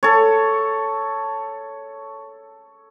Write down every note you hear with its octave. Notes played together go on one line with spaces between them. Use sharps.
A4 C#5